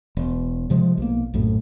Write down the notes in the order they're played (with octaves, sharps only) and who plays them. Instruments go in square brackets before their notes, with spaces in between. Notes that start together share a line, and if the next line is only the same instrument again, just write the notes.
[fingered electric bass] E1
C3 F3 G3 G#3
B1 F3 A#3
A#1 F#2 A2